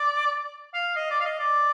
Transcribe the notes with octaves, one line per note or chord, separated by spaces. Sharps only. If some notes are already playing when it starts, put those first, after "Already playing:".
Already playing: D5
F5
D#5
D5
F5
D#5
D5